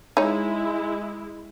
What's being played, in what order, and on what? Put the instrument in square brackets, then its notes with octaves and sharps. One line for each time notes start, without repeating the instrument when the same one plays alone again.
[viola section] G#3 E4 [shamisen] D#4 C#5